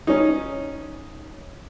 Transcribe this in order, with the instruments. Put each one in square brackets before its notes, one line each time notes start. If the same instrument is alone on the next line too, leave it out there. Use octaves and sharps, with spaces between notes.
[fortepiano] C#4 D#4